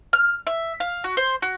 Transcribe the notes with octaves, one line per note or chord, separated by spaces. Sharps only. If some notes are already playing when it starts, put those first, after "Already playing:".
F6
E5
F5
F#4
C5
F#4